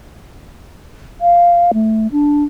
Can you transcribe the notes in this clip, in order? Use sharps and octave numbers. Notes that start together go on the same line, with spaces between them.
F5
A3
D4